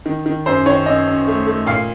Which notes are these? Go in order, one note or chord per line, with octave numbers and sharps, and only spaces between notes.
D#3
D#3
F#2 C5
D#3 C#5
F#2 D#5
F#2
A3
A3
A#2 F5